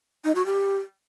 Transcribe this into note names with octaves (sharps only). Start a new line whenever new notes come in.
D#4
F#4
G4